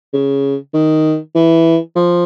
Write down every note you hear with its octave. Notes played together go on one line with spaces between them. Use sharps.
C#3
D#3
E3
F3